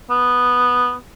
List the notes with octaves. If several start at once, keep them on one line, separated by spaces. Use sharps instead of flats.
B3